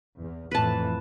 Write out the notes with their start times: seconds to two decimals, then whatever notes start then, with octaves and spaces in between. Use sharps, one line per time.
0.18 E2
0.51 F2 A2 E3 B4 A5